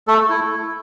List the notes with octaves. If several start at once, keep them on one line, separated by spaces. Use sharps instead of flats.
A3 A4
E4